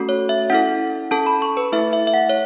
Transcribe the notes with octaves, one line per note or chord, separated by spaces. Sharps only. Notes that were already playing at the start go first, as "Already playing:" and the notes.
Already playing: A3 C#4 F#4 A4
C#5
E5
C#4 E4 A4 F#5
C#4 A4 A5
B5
C#6
B4
A3 E4 A4 E5
E5
E5
F#5
C#5